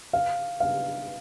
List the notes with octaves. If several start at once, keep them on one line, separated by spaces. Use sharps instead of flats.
F5
F5